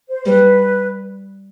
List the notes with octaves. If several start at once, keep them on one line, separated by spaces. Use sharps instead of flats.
C5
G3 B4